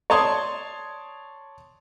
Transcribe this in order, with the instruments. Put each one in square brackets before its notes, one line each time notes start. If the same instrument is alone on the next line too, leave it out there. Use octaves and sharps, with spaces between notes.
[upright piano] C#5 D5 A5 C6 D#6 G#6